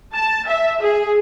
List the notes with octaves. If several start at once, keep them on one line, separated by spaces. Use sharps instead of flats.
A5
E5
G#4